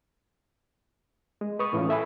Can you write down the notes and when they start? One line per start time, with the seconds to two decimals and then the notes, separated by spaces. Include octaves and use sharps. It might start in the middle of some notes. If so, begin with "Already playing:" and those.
1.41 G#3
1.59 B4 C#6 D#6
1.73 A2 E3 C#4 F4
1.89 A4 E5 G#5 B5